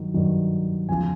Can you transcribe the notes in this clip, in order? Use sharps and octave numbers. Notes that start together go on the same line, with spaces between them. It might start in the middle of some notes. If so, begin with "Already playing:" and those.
Already playing: G2 D#3 F#3
G2 D#3 F#3
E2 C#3 F3 G#5